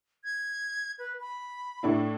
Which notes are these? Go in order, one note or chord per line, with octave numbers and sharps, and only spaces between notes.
G#6
B4
B5
A2 D4 E4